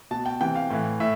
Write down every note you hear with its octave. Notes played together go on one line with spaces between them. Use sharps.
B2 A5
G5
C3 E3 G5
F5
A2 E3
A2 E5